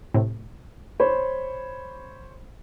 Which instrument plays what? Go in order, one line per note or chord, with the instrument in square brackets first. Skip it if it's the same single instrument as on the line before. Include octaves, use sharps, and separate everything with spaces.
[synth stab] A2 C3
[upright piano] C5 C#5 B5